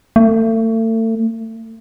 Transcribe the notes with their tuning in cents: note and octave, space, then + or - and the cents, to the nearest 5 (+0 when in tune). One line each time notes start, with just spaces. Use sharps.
A3 +35